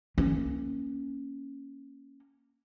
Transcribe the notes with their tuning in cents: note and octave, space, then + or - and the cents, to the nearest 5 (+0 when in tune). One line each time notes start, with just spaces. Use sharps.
A#3 +0 C#4 -10